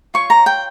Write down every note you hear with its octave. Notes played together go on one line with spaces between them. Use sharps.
F4 C#5 C#6
A#5
G5